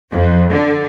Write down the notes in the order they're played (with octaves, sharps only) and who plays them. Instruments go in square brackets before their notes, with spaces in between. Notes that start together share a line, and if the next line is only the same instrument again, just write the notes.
[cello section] F2
D3